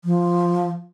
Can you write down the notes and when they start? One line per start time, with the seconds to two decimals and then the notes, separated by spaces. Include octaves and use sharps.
0.05 F3